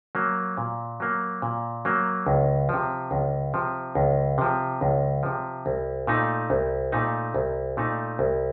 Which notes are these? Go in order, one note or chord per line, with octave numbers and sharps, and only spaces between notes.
F#3 A#3
A#2
F#3 A#3
A#2
F#3 A#3
C#2
C3 F3
C#2
C3 F3
C#2
C3 F3
C#2
C3 F3
C2
A#2 A3 D#4
C2
A#2 A3 D#4
C2
A#2 A3 D#4
C2